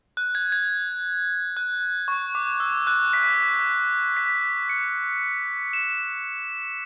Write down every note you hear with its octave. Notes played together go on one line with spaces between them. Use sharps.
F#6
G#6
G#6
F#6
C#6
D6
E6
F#6
B6
B6
C#7
E7